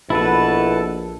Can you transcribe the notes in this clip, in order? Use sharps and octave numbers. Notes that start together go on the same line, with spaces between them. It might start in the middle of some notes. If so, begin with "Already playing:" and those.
A#1 B2 E4 A4 B4 A5